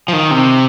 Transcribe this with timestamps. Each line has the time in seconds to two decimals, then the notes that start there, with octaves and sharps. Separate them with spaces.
0.08 F3
0.13 D#3
0.31 C3